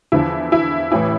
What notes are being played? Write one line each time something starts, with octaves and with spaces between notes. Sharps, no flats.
E2 D3 F3 E4
E4
A1 A2 E3 E4